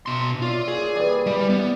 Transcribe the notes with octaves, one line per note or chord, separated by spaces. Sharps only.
B2 C6
F4 C#5 D5 E5
A#2 G#4
E3 G3 D5
E3 G3 B4
B3